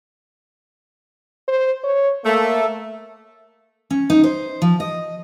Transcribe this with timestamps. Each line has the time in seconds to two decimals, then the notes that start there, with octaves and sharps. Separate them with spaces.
1.48 C5
1.84 C#5
2.24 A3 A#3
3.90 C#4
4.10 D#4
4.24 C5
4.62 F3
4.80 D#5